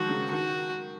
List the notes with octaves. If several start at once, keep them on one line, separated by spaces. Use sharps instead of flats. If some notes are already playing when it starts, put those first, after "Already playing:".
Already playing: D#3 F3 F#3 G#3 F#4
C#3
D#3 F#4